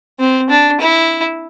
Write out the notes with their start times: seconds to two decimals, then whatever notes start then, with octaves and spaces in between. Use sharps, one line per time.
0.19 C4
0.50 D4
0.80 E4